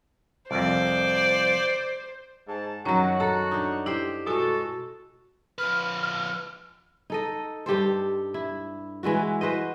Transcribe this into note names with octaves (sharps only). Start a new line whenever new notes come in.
C2 F2 C5 D5
G#2 A5
F#2 D#3 F#3 C#4 F#4 C#5
A4 A#5
D4 D#4
E4 G4 C5
B2 G#3 F#4 A4 G#5
F3 B4 F6
D#4 A4 D#5
G2 G4 A4 C5
E4
E3 G#3 E4 F#4
F#4 B4 C5 D#5